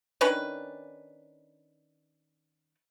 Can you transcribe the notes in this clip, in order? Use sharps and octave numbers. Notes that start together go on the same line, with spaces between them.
D#3 C#4 D4 B4